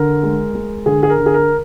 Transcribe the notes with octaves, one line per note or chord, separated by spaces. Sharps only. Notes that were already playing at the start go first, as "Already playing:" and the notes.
Already playing: D3 A#4
G#3
G#3
D3 G#4
G#4
A#4
D3
G#4
A#4